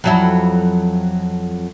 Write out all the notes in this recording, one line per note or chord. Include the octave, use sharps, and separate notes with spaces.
F2 F#3 E4